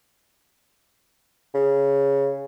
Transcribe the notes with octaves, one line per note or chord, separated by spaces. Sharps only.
C#3